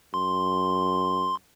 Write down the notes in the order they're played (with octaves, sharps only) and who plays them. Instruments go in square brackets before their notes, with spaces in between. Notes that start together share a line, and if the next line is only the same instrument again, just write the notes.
[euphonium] F#2 [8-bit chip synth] C6